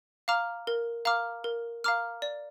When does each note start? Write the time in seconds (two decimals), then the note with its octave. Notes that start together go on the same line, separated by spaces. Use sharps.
0.28 F5 A#5 D6 F6
0.67 A#4
1.05 F5 A#5 D6 F6
1.44 A#4
1.84 F5 A#5 D6 F6
2.22 D5